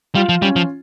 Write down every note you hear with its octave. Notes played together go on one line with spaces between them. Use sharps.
G3 F4
F3
G3 C#4
F3